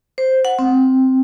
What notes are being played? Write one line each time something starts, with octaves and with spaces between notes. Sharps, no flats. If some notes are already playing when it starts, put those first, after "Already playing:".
C5
F#5
C4